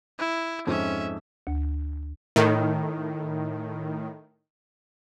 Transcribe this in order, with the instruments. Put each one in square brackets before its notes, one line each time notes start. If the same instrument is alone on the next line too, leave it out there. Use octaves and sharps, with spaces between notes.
[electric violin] E4
[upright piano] F2 G#2 [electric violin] C#4 E5
[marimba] D2
[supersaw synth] A2 D#3